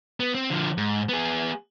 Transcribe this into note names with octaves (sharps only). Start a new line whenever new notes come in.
B3
C4
D3 F3
G#2
B3 G#4